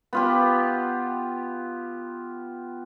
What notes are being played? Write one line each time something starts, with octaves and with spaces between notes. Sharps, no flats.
B3 F4 G4